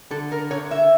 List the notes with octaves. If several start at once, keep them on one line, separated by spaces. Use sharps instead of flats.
D3 A4
A#4
D3 C#5
E5